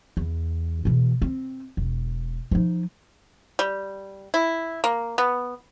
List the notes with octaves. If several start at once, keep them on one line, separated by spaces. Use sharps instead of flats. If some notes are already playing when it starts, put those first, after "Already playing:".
E2
B2 E3
C4
E1
F3 D#4
G3
E4
A#3
B3